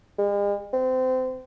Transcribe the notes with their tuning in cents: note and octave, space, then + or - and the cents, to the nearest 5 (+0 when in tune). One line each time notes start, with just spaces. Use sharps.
G#3 -45
C4 -25